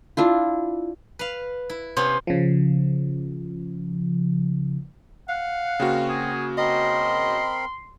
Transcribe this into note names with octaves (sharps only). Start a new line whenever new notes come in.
D4 E4 F4
B4 F5
E4
C3 B3 C#4 C5
C#3 F3
F5 F#5
C#3 A#3 C4 F#4
G#4
C4 A#4 D#5 B5 C6